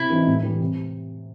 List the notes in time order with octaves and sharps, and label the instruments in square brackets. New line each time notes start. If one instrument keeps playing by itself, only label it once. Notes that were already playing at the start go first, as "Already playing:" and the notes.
Already playing: [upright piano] C3 [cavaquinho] E4
[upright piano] E3 G3 C4 D#4
A2
E3 G3
C3